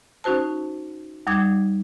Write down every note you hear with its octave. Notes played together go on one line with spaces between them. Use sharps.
C#4 D#4 F#4 C5 A5
D#2 G3 D#4 D6 G#6